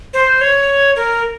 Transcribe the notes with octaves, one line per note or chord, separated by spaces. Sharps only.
C5
C#5
A#4